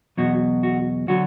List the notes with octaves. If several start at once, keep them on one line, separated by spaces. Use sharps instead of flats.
E2 B2 F#3 F#4
F#4
D3 F#3 F#4